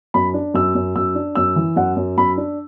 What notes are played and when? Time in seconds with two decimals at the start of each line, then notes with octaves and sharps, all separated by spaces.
0.14 F#2 B5
0.34 D4
0.54 F#2 E6
0.75 F#2
0.96 F#2 E6
1.15 D4
1.35 F#2 E6
1.56 E3
1.76 F#2 F#5
1.96 F#2
2.18 F#2 B5
2.37 D4